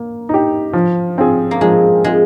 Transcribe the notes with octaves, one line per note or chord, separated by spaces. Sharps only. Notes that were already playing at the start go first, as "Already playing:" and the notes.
Already playing: A#3
D#4 G4
F3
C4 F4 G#4
A#3
F3 G#3
G#3 C4 F4 G#4